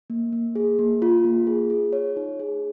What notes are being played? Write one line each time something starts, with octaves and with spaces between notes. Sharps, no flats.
A#3
A#3
G#4
A#3
F4
A#3
G#4
G#4
C#5
D#4
G#4